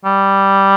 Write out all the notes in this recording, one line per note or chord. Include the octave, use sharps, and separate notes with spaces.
G3